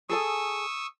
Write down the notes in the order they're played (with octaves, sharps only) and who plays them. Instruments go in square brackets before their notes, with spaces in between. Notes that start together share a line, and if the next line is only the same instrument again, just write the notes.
[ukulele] G#4 A4 G#5 [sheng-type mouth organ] C#6 D#6 E6